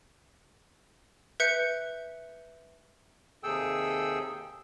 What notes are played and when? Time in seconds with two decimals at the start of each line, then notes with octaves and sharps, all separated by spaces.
1.40 B4 E5 G6 C#7
3.43 D#2 C3 G#4 A4 G5 E6